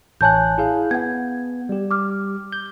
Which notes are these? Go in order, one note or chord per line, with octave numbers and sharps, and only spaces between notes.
A1 C#5 G#5 A5 F#6 G6
E4 G#4 F5
B3 F#5 G#6
G3 G4
D6 F6
G6